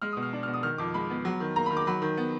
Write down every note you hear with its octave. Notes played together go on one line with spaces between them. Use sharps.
G#3 F6
D#6
B2
F6
D4
F6
B2
D#6
D#3 F6
F2 D6
G#3 B5
B3
F#3
D#3
A#3 A#5
B5
D#3
D6
F#3 B5
D#3
B3